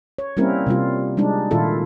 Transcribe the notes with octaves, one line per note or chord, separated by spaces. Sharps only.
C#5
G3 A#3 C4 C#4 E4 A#4
C3 G3 F4
G3 G#3 D4 D#4
A#2 D#3 E4 F4 A4